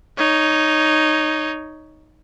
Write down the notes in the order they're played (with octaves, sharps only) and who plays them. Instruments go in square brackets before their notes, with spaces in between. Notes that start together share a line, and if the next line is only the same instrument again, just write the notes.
[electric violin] D#4 C#5